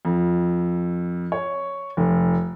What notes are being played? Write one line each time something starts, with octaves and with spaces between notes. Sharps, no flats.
F2
C#5
F1